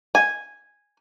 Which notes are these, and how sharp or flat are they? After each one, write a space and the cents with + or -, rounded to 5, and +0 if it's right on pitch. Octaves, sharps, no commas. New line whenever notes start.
G#5 -5